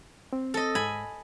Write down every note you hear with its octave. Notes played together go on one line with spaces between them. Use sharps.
C4
A4 D#5
G#2 G#5 B5